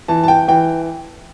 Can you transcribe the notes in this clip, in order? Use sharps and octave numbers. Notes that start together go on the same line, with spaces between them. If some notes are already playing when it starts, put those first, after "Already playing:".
E3 A5
A5
G5
E3 G5